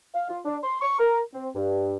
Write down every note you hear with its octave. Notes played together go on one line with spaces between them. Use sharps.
F5
F4
D4
C6
C#6
A#4
C4
G2